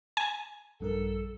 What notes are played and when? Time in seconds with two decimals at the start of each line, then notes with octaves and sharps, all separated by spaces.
0.17 G#5
0.80 A#1 G2 A4 A#4